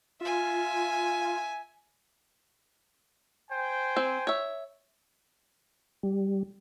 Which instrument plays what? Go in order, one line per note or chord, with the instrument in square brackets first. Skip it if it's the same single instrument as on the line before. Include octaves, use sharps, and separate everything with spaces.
[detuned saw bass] F4 [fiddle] E5 G#5
[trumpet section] C5 G5 G#5
[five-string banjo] C4
C#5 E5
[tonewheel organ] G3